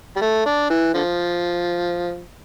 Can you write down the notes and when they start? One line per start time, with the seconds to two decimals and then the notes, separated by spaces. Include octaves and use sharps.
0.16 G3
0.21 A3
0.46 D4
0.70 E3
0.94 D3 F3